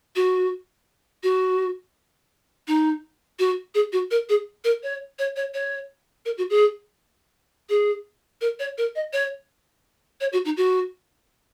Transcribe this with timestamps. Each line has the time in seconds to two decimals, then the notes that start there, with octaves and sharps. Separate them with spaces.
0.16 F#4
1.23 F#4
2.68 D#4
3.39 F#4
3.75 G#4
3.93 F#4
4.11 A#4
4.29 G#4
4.65 A#4
4.83 C#5
5.19 C#5
5.36 C#5
5.54 C#5
6.26 A#4
6.38 F#4
6.50 G#4
7.69 G#4
8.41 A#4
8.59 C#5
8.78 A#4
8.96 D#5
9.13 C#5
10.21 C#5
10.33 F#4
10.45 D#4
10.57 F#4